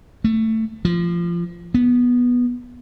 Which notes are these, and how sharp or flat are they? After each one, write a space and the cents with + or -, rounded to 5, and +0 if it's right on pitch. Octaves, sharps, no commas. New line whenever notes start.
A3 +15
F3 -20
B3 -10